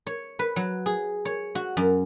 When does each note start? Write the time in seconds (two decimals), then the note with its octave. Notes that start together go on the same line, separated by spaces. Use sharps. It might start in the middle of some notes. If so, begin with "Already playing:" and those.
0.07 C#5
0.39 B4
0.56 F#3
0.86 G#4
1.25 C#5
1.55 F#4
1.77 F#2